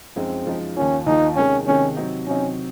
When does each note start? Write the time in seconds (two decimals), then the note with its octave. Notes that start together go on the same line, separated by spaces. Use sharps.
0.16 F#2 F3 G#3 C4 D#4
0.46 F#2 F3 G#3 D#4
0.76 D#2 D#3 A#3 C#4 F4
1.06 D#2 D#3 A#3 D#4 F4
1.36 C3 D#3 G#3 C#4
1.67 C3 D#3 G#3 C#4
1.96 C3 F#3 C4 D#4
2.27 C3 F#3 C4 C#4 D#4